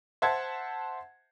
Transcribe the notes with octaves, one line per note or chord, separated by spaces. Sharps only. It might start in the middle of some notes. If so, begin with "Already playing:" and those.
C5 E5 F#5 A5 G#6